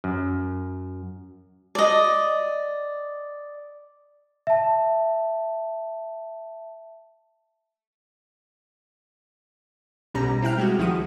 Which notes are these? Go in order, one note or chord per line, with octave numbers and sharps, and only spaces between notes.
F#2
D5 D#5
E5 A5
B1 B2 G3 C#4 A#5
C4 E4 G5 F6
G3 G#3 F#4
C#2 D#3 F3 E4 F#4 D#6